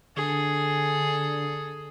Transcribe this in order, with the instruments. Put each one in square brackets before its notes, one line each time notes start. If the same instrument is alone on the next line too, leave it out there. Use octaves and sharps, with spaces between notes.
[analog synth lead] D3 [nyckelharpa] G#4 A4